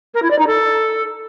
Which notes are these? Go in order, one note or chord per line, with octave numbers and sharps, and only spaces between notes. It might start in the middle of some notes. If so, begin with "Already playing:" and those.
A#4
E4
D5
D#4
A4